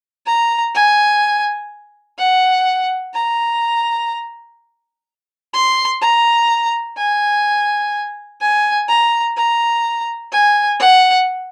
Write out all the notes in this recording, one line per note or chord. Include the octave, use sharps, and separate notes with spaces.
A#5
G#5
F#5
A#5
C6
A#5
G#5
G#5
A#5
A#5
G#5
F#5